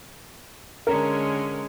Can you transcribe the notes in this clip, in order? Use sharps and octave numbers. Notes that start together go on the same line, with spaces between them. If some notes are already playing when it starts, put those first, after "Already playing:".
D3 G#3 C#4 A#4